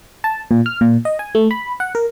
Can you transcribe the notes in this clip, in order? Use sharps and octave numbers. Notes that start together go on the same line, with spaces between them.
A5
A#2
F6
A#2
D#5
G#5
A3
B5
F#5
A#4